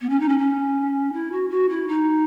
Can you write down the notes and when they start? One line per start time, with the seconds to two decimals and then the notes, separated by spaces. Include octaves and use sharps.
0.01 B3
0.09 C#4
0.20 D#4
0.28 C#4
0.38 C#4
1.13 E4
1.31 F#4
1.49 F#4
1.69 E4
1.87 D#4